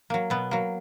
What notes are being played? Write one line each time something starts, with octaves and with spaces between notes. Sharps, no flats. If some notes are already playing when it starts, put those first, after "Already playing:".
F#3 A#3
B2 B3
F#3 A#3